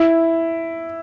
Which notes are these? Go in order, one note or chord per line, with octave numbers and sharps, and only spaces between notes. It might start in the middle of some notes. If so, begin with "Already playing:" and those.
Already playing: E4